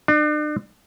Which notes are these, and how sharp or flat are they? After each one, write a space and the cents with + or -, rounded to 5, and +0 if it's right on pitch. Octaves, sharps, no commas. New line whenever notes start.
D4 +40